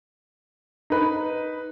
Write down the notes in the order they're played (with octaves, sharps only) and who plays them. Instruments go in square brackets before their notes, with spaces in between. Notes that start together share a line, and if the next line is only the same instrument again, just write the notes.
[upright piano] D#4 B4